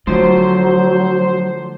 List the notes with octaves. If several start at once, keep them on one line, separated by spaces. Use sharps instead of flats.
D3 F3 F#3 A3 C5